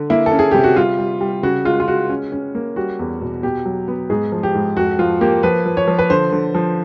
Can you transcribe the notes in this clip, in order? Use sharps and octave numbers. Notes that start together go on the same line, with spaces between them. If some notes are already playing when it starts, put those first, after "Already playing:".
Already playing: D3
A#3 E4
A4
C#4
G#4
C3 G4
F#4
G3 F4
G3
G3
C#3 F#4
G#3 F4
F4
G#3 F#4
C#4
C#4
A#3
G3 F#4
E2
B2
B2 G4
F#3
B3
G#2 G#4
F3
G4
G#2
F2 F#4
F3 F4
A#3 G4
F3 B4
F3
C#5
F3
B4
D3 C5
D3
F3